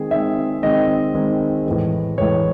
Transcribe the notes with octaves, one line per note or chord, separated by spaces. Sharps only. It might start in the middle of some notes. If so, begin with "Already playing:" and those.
Already playing: D#3 G#3 C4 G#4
D#3 G#3 C4 E5
D#3 G#3 C4 D#5
D#3 G#3 C4
A2 E3 G#3
A2 E3 G#3 C#5